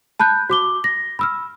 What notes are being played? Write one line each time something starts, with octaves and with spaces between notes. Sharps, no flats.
A5 B5 F#6 G6
F#4 D6 G7
A#6
B5 E6 F6